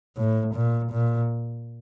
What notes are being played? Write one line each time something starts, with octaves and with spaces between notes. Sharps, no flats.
A2
A#2
A#2